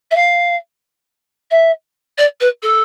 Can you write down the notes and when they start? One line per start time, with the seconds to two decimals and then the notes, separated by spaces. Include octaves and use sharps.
0.11 E5
0.15 F5
1.51 E5
2.18 D5
2.40 B4
2.62 A4